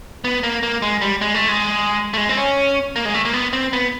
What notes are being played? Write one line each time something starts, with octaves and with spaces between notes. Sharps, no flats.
B3
A#3
A#3
G#3
G3
G#3
A3
G#3
A3
G#3
C4
C#4
A#3
G#3
A3
A#3
B3
C4
B3